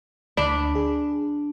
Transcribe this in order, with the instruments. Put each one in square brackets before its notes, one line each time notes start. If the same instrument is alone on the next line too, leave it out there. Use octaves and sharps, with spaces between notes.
[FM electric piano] D2 B5 [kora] D4
[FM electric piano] G#4